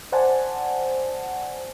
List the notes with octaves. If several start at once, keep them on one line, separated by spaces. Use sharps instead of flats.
C5 D5 F#5 G#5 A5